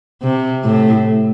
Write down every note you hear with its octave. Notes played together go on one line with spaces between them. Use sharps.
C3
A2